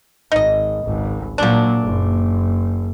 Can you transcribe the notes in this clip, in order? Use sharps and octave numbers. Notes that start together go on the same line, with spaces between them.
G#1 D#4 D#5
G#1 C#2
A#2 F3 F#3 D4
F#1